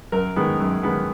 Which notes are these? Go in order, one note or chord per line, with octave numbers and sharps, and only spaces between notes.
F#2 A#4
D#3 G#3 B3
F#2
D#3 G#3 B3